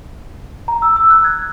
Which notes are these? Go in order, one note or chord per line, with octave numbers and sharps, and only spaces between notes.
A#5
E6
E6
F#6
G#6